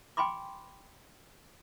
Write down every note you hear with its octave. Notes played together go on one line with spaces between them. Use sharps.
G5 G#5 B5 C6 D6